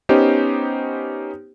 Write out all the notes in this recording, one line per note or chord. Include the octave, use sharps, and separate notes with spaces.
B3 C#4 D#4 G4 C5